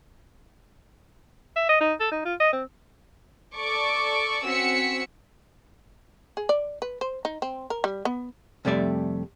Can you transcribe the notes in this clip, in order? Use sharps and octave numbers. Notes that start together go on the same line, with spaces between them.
E5
D#5
D#4
A4
D#4
F4
D#5
C4
A4 D5 C#6 D6
C4 C#4 F#4 E6 B6 C#7
G#4
D5
B4
C5
D#4
C4
A#4
G3
B3
F2 C3 G3 A3 D5 E5